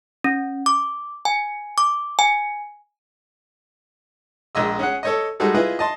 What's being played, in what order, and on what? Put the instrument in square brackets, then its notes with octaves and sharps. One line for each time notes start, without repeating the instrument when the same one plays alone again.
[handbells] C#4
D6
G#5
D6
G#5
[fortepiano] A#1 G#3 D#5 E6
C#4 G#4 F#5
A4 C#5 D#5
G3 G#3 D#4 F#4 G#4 A4
E4 F4 G#4 B4 D#5
D#5 A5 C6